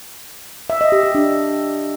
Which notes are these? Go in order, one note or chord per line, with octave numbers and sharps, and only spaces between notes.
E5
D#5
G4
G4
D4